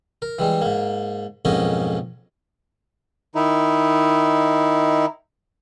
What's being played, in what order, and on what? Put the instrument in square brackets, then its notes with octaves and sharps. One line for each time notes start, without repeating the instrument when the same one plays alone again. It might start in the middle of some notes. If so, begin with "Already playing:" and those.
[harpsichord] A#4
E3 G3 G#3
G#2 A#3
B1 F2 G#2 A#3 C#4 D#5
[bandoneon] D#3 D#4 E4